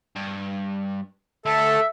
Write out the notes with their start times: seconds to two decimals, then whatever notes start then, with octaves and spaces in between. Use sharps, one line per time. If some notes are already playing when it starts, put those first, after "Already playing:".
0.16 G2
1.46 D2 A4 E5